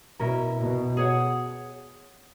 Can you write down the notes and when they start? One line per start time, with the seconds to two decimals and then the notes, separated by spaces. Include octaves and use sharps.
0.20 B2 C#4 E4 A#4
0.59 B2
0.97 G#4 C#5 F#5